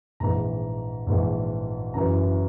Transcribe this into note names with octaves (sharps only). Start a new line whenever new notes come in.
A#1 G#2 E3 A#5
A#1 G#2 E3
F#1 F#2 E3 A#5